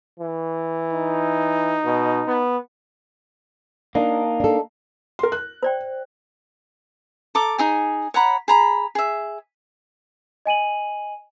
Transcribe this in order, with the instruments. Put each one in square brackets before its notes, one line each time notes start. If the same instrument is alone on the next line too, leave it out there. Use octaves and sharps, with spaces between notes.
[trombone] E3
[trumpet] D#4
[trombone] B2
B3
[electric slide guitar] A#3 D#4 [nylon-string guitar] D4
[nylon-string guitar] D4 A4
[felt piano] A#4 C6
F#6
[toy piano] C5 D5 G5
[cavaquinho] A4 A#5 D6
D#4 G#4 G#5
C#5 F#5 A#5 B5
G#4 A#5 B5
G#4 E5
[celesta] D#5 G#5 D#7 F#7